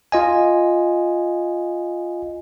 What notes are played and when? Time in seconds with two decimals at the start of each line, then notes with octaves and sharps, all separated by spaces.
0.12 F4 D#5 G#5